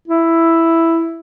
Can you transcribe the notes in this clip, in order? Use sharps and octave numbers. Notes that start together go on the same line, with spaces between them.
E4